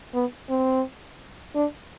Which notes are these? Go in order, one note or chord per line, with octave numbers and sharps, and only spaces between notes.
B3
C4
D4